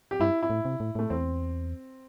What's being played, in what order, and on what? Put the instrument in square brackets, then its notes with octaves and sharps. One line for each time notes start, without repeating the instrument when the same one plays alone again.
[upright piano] G4
[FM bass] G2 [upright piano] E4
[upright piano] E4
[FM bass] A2
C3
A2
[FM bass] A2 [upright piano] A3
[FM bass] E2 [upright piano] C4